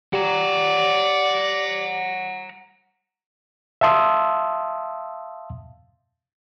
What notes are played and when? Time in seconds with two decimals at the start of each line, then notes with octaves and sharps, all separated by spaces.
0.13 G4 D5 F#5 A#5
3.81 E5 F5 A5 C6 D#6 E6